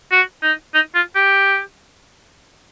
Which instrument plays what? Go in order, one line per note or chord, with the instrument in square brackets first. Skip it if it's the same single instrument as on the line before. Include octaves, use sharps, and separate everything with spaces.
[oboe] F#4
D#4
D#4
F4
G4